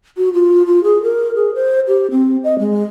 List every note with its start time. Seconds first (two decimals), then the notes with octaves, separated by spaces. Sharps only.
0.17 F#4
0.33 F4
0.66 F4
0.84 G#4
1.03 A#4
1.35 G#4
1.55 C5
1.88 G4
2.11 C4
2.44 D#5
2.59 G#3